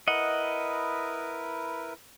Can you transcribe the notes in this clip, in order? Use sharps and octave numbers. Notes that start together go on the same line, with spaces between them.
E4 A#4 B4 D#5 F#5